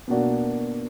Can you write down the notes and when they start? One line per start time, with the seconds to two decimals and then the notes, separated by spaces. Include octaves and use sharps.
0.08 B2 A#3 D4 F#4